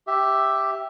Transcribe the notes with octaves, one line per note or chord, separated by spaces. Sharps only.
G4 E5